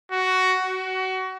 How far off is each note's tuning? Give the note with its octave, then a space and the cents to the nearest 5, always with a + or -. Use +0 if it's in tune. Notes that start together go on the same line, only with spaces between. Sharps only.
F#4 +10
F#4 +25